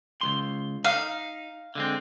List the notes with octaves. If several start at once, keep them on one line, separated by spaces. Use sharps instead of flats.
C#2 G2 C6
D#4 F5
D3 G#3 C4